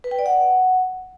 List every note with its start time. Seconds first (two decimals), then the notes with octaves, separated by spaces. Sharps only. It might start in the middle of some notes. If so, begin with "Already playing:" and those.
0.04 B4
0.11 G5
0.19 D5
0.26 F#5